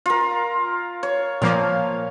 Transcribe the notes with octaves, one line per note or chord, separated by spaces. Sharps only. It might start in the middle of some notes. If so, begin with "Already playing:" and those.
F4 A#4
C#5
A#2 F3 A#3 F5